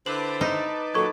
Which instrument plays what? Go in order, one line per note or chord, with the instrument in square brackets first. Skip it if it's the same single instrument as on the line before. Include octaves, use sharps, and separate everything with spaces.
[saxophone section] D3 E4 C5 [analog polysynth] B4 A5 D6 [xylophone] F#7
[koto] D#4
[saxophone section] A#2 D#3 F#3 [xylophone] A4 C#6 G#6